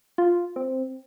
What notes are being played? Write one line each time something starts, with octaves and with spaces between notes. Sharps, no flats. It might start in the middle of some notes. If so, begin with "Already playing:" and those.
F4
C4